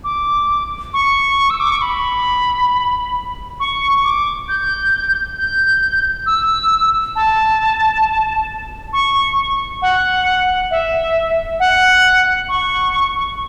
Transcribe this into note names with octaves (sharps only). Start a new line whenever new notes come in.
D6
C#6
E6
D6
C#6
B5
C#6
D6
G6
G6
E6
A5
C#6
F#5
E5
F#5
C#6